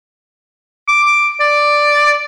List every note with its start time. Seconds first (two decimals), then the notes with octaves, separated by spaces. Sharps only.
0.88 D6
1.41 D5